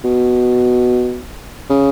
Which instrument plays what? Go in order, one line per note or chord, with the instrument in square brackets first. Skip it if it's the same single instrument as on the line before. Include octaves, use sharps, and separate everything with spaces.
[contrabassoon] B2
C#3